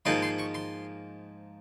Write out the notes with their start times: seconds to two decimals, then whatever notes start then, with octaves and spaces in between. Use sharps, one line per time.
0.05 G#2 F3 A#3 D#4 C6
0.22 C6
0.39 C#6
0.54 C6